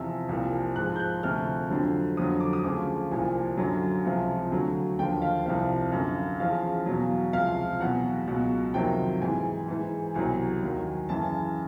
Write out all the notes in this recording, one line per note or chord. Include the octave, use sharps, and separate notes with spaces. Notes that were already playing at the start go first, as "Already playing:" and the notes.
Already playing: E2 C3 F3 E6
C2 A#2 F3
G#2 F3 F#6
G6
F#6
D2 C3 F3 F6
F2 D3 F#3
F2 D3 F#3 D#6
D6
D#6
D2 C#3 F3 D6
C2 A#2 F3 G#5
F#2 D3 F#3
C#2 C3 F3
D2 D3 F#3
D#2 D3 F3 G5
F5
C2 C3 F3 F5
F#2 D3 F#3
E2 C#3 F3 F5
E2 B2 F#3
C#2 C3 F3 F5
E2 B2 F#3 F#5
C#2 B2 F#3
F2 C3 D#3 F#3 G5
G#2 E3 G#5
G#2 E3
C2 B2 F#3 G#5
D#2 D#3 F#3
F#2 C#3 E3 A5